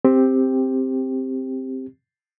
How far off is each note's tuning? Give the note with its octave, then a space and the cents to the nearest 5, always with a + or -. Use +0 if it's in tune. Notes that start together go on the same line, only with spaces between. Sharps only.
C4 +0 G4 +10